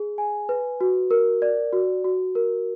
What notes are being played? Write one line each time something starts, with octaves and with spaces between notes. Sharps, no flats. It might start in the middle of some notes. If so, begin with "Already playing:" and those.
Already playing: G#4
G#5
B4
F#4
A#4
D5
F#4
F#4
A#4